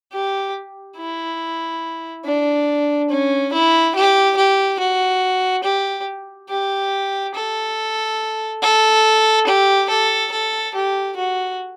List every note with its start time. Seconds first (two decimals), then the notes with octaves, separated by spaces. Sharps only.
0.13 G4
0.97 E4
2.25 D4
3.10 C#4
3.53 E4
3.95 G4
4.37 G4
4.80 F#4
5.64 G4
6.50 G4
7.35 A4
8.62 A4
9.47 G4
9.90 A4
10.32 A4
10.75 G4
11.16 F#4